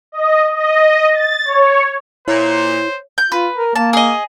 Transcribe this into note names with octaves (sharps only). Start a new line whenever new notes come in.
D#5
D#5
A6
C#5
A#2 E4 C5 C#5
G6
F4 B4
A#4
A#3 A5
G#4 D#5